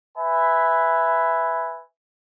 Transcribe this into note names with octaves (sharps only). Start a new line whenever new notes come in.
B4 E5 G#5